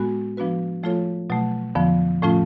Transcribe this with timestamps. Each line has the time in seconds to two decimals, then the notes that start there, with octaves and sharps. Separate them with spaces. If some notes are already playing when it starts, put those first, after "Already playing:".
Already playing: A2 G#3 B3 F#4
0.37 F3 B3 D4 F#4 B4
0.83 F3 A3 F4 A4 C#5
1.30 B2 F#3 A3
1.75 F2 D3 F3 B3
2.22 A2 F3 A3 C#4 F4